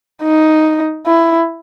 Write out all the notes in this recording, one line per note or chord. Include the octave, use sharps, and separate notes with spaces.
D#4
E4